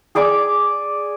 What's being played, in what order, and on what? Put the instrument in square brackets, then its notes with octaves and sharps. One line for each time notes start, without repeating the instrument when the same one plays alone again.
[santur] G#4 D5 G#5 D6